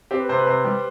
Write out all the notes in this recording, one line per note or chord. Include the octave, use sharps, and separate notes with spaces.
C4 G4
B4
C3 C5
B4
C3 C5
G3